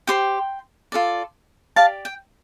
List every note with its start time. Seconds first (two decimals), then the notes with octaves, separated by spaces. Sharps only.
0.07 G4 C5 G5 C6
0.92 F4 A4 D5
1.76 G4 D5 F5 A5
2.05 G5